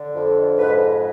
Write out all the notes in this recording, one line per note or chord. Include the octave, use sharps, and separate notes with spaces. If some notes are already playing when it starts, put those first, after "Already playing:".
Already playing: D3
F2
G#2 B4